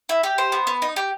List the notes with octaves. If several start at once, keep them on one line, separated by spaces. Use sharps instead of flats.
E4
G4
C5
B3
B3
D#4
G4